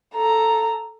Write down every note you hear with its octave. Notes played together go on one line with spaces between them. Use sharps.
A4 A#5